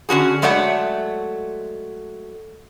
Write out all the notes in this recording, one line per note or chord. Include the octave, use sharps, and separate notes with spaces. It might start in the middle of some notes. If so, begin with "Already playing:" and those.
D3 C#4 F#4 G#4
F#3 G#3 A3 C#5 D5 F#5